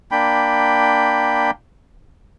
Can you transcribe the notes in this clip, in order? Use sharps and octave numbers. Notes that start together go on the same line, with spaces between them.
A#3 D4 G5 B5